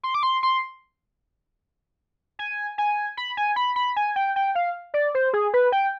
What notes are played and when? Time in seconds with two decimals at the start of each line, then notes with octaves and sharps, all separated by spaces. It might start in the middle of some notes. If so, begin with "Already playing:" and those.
0.03 C6
0.14 D6
0.23 C6
0.43 C6
2.39 G#5
2.78 G#5
3.17 B5
3.37 G#5
3.56 B5
3.76 B5
3.96 G#5
4.16 G5
4.36 G5
4.55 F5
4.94 D5
5.15 C5
5.33 G#4
5.54 B4
5.72 G5